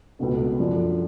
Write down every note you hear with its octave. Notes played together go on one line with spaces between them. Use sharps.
C#2 B2 A3
F#2 F3 A3 D4